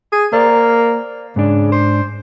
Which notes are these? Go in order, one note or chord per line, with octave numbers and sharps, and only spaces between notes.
G#4
A#3 C5 D5
G#2 C#3 D4
C5